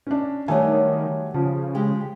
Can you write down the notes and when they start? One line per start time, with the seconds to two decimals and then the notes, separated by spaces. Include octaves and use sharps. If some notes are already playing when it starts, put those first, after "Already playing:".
0.07 C#4 D4
0.48 D#3 F#3 G3 A3 C#5 G#5
1.34 C#3 F3
1.75 G#3 F4 G4